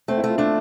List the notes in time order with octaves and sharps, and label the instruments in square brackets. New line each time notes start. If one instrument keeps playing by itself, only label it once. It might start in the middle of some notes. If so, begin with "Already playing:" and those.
[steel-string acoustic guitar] A3 [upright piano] C4
[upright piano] E4
[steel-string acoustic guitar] A3 [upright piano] F4
[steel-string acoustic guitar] A3 [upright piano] D4